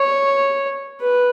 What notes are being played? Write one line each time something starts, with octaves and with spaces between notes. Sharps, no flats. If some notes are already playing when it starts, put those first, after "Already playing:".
Already playing: C#5
B4